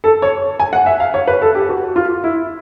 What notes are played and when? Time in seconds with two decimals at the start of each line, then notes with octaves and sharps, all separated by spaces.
0.04 A4
0.22 C#5
0.60 G#5
0.73 F#5
0.86 E5
1.00 F5
1.14 C#5
1.27 B4
1.42 A4
1.55 G4
1.69 F#4
1.96 F4
2.24 E4